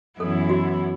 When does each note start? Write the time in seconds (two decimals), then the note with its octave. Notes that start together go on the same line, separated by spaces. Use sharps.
0.20 F#2 E3 B3 E4 A4 C#5
0.50 F#4